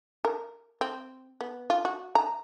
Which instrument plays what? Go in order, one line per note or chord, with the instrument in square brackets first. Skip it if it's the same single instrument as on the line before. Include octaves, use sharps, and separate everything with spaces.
[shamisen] A#4
C4
B3
F4
F#4
A#5